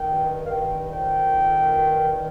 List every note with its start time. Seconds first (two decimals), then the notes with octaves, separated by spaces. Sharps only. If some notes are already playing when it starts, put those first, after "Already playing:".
Already playing: D#3 G5
0.11 G2
0.46 F5
0.50 D#3 G5
0.91 F2 G5
1.31 D#3
1.72 G2
2.12 D#3